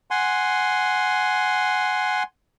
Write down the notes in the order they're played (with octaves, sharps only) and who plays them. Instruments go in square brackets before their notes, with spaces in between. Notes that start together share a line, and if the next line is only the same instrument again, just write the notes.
[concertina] F#5 G#5 C6